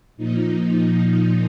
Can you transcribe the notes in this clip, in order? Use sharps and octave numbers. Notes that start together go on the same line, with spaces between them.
A#2 F3 D#4
D#4